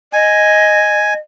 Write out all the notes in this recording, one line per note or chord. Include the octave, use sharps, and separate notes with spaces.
D#5 G#5